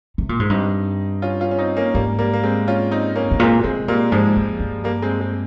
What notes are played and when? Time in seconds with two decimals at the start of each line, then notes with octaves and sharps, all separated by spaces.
0.18 C3
0.29 A#2
0.39 G#2
0.50 G2 C4 D#4
1.22 C#4 F4
1.40 C#4 F4
1.51 C#4
1.58 C4 D#4
1.77 A#3 C#4
1.94 G#2 G3 A#3
2.19 G3 A#3
2.33 A#3
2.43 G#3 C4
2.68 C#4 F4
2.91 C4 D#4
3.16 A#3 C#4
3.31 G#2
3.39 A#2 G#3 C4
3.63 C3 G#3 C4
3.88 A#2 G3 A#3
4.12 G#2 F3 G#3
4.37 F2
4.60 G2
4.84 G3 A#3
5.02 G#3 C4
5.20 G#3 C4